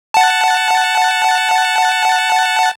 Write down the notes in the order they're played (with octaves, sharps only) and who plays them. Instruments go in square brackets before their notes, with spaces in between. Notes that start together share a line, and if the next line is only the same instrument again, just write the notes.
[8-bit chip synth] F#5 A5